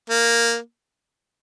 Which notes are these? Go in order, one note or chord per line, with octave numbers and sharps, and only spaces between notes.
A#3